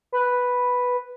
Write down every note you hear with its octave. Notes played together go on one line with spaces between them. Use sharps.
B4